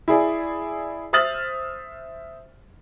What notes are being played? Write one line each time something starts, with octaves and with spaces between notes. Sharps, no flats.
E4 G#4 D5
C5 E5 D#6 F6 A6 F#7